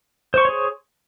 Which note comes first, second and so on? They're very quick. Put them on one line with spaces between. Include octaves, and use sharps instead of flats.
C5 C#6 C6 C#5 G#4